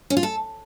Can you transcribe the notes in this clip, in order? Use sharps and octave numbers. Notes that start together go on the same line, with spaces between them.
C#4
F4
A4